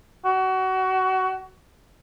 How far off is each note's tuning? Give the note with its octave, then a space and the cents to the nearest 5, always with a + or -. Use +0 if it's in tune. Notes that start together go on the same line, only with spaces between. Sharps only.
F#4 +25